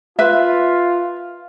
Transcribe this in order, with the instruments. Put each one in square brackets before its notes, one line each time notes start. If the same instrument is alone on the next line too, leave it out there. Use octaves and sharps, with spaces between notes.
[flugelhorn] F4 [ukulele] B4 E5